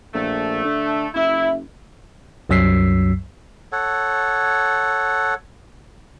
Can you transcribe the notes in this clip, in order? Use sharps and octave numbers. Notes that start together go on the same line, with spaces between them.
A#1 A3
D3
F#1 E4 E5
C2 F#2 F#3 E6 B6 C7
A4 C#5 F#5